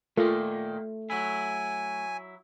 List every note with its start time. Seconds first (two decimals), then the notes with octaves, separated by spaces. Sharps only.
0.17 A#2 D#3 A3 A#3 F4 A4 A#4
1.10 F#3 E4 G#5